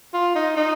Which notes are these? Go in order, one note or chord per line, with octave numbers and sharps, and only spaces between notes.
F4
D#4
D#4